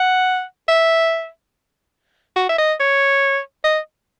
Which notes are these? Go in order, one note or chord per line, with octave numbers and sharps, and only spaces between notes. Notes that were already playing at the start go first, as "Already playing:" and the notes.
Already playing: F#5
E5
F#4
E5
D#5
C#5
D#5